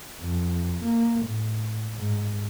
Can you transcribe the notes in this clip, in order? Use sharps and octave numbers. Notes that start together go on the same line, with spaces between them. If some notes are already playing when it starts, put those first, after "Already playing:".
F2
A#3
A2
G#2